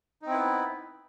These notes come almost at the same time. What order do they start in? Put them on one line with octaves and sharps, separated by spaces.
D#4 C4 E4 B4 B3